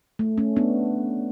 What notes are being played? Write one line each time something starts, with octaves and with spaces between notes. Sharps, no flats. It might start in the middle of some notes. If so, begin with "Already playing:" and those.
A3
A3 C#4
B3 D4